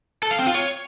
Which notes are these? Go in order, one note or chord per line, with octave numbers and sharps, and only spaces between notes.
A4
F5
C4
F4
C#5